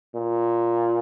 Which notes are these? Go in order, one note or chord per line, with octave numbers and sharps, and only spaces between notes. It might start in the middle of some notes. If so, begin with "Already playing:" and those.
A#2